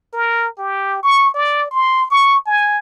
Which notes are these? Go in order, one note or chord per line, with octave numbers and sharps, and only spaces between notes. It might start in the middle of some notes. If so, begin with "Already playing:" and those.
A#4
G4
C#6
D5
C6
C#6
G#5